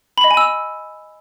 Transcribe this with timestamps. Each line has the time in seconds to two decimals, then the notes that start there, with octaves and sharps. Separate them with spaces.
0.18 B5
0.24 D#5
0.31 G#5
0.37 E6